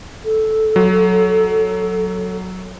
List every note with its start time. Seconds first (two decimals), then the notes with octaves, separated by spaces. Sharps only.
0.25 A4
0.76 F#3